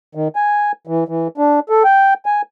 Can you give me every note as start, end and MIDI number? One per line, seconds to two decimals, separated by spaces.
0.15 0.28 51
0.36 0.72 80
0.87 1.04 52
1.08 1.28 52
1.38 1.60 62
1.70 1.83 69
1.84 2.14 79
2.26 2.42 80